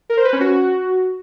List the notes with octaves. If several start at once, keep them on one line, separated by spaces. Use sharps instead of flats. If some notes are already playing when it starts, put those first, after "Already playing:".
A#4
C5
B4
C#4
F#4